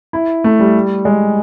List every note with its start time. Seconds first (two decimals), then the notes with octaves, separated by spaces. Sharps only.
0.13 E4
0.44 A3
0.59 G3
1.05 G#3